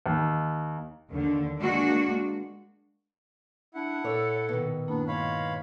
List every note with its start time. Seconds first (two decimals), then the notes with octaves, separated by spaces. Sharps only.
0.06 D#2
1.09 D#2 D3
1.59 G#3 A#3 D4 F#4
3.74 D4 E4 F#5
4.04 A#2 A4 C#5
4.49 B2 D#3
4.88 G2 A#3 B3 D4 E4
5.08 G#3 C#5 F5 B5 F6